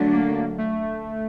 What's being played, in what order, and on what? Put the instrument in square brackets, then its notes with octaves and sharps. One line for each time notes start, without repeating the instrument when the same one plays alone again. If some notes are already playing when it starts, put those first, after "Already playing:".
Already playing: [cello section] D3 F#3 A3 D4
[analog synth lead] A#3
A3